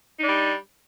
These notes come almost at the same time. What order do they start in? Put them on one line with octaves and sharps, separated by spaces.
D#4 D4 G3